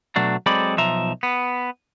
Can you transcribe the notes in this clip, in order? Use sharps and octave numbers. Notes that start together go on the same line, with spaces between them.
B2 F#3 A3 D4
F#3 G#3 C4 A4 D5 B5
B1 F3 E5 A#5
B3